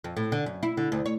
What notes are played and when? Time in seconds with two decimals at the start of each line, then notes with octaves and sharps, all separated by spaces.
0.04 F2
0.17 A2
0.32 D3
0.46 F#2
0.63 E4
0.77 D3
0.92 D2
1.06 C#5